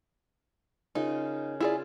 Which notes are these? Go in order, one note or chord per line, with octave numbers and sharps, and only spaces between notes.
C#3 D#4 F4 A#4
E4 F4 G#4 D5